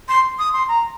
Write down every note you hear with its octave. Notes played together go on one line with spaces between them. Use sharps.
C6
D#6
C6
A#5